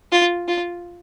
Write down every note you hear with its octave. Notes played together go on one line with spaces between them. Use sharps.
F4
F4